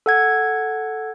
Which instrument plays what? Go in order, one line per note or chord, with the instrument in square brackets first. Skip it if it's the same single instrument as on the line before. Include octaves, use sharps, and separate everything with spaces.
[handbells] A4 F#5 G#6